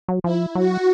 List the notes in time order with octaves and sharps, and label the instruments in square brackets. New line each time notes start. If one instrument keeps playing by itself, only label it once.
[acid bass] F#3
[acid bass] F3 [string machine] E4
[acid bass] F#3 [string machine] F#4